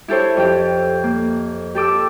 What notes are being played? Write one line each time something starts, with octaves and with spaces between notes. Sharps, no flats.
E4 G4 A4 C5 C#5
F2 G4
A#3
G4 A4 D6 E6